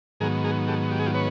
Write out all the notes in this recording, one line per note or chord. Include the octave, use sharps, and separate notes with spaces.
G#2 D#3 F#3 B3 G#4 A#4
G#4 A#4
G4 A4
G4
G#4
F4 G4
B4 C#5